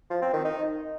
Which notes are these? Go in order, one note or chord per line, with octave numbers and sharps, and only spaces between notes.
F3
C4
D#3
D#4